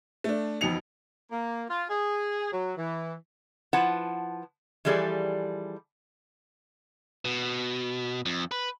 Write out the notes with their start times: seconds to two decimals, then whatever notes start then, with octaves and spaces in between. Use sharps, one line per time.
0.24 A3 D4
0.61 E1 F2 B2 D#4 C#7 F7
1.31 A#3
1.70 F4
1.90 G#4
2.52 F#3
2.77 E3
3.73 F3 E4 B4 F#5 A5
4.85 E3 F3 G3 G#4 A4 D5
7.25 B2
8.26 F2
8.51 B4